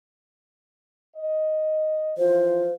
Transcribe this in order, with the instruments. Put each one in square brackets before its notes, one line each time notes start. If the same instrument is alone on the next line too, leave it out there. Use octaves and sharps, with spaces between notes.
[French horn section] D#5
[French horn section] E3 F3 F4 [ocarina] C5